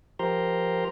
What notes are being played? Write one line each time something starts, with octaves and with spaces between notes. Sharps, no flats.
F3 G4 A#4 C5 A#5 C6